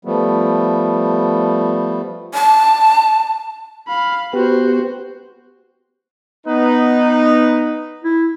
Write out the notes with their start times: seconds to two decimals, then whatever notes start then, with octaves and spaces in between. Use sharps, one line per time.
0.05 F3 G3 A3 B3
2.34 A5
3.88 F5 B5
4.33 B3 F#4 G4 C5
6.46 B3 D#4 B4
8.04 E4